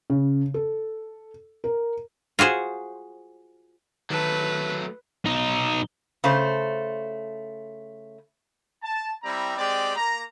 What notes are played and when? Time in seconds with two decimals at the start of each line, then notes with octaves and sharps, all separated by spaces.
0.10 C#3
0.54 A4
1.64 A#4
2.39 F4 F#4 G#4 C5
4.10 D#3 F#3 A3 B4 A5
5.26 B1 D#4
6.24 C#3 A3 C5
8.82 A5
9.23 G3 C4 E4 A#5
9.57 G#3 C4 G4 D5
9.96 A#3 A#5